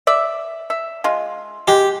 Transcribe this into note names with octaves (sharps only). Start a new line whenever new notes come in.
D5 E5
E5
G#3 F4
G#3 G4